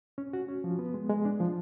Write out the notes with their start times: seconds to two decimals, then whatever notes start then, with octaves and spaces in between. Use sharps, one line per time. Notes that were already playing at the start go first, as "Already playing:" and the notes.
0.18 C#4
0.33 F#4
0.48 C#4
0.64 F3
0.79 B3
0.94 G#3
1.09 G#3
1.25 D4
1.40 F3